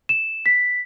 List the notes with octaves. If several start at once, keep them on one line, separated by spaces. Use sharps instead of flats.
E7
B6